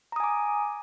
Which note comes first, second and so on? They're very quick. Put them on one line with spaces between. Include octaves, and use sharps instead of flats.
A#5 D#6 G#5 D6